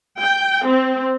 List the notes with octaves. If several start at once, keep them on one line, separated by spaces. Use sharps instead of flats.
G5
C4